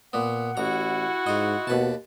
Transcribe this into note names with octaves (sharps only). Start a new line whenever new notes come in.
A#2 B3 F#5
A1 E4 F#4 A#5
G#2 F4 D#5
D#2 B2 B4 A5